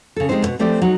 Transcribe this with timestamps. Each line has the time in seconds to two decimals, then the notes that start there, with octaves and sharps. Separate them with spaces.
0.16 C#3 A4
0.29 G3 G#3 C4 D#4 C5
0.42 E2 B2
0.59 F3 A3 C4 G4 D5
0.82 F#3 D#4